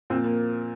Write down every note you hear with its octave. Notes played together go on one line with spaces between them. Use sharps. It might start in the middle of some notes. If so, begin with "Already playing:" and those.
A#2 F3 C4
A#3